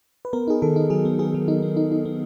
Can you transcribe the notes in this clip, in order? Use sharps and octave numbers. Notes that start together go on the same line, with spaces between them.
B4
B3 A#4
D#4 G#4
D#3 A4
D#4
F#3 G#4
B3
B3 G#4
F#3
D#4
B3
D#4
D#4
B3